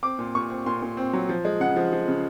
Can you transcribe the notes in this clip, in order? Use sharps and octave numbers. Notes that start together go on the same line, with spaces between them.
C4 D6
A#2
A#2 C#6
C4
A#2 C6
A#2
C4
F#3
F3
G#3
C#3 F#5
F3
F3
C#3